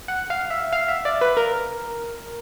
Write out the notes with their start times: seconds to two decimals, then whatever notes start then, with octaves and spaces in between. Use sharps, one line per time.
0.08 F#5
0.30 F5
0.50 E5
0.72 F5
0.88 E5
1.05 D5
1.21 B4
1.37 A#4